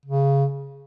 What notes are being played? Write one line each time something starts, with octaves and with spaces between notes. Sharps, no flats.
C#3